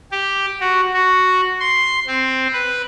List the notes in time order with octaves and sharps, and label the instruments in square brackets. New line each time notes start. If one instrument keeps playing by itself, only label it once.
[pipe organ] G4
F#4
F#4
C6
C4
B4